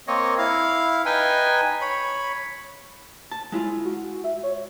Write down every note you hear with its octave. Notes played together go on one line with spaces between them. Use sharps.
A#3 C4 C#5 D#5
E4 F5
D#4 B4 G5 G#5
C#5 B5
A5
G#3 E4 F4
F#4
E5
C#5